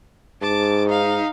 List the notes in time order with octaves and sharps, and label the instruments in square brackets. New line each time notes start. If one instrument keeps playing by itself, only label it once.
[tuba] G#2 [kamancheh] A5 D6
[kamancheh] D#4 F5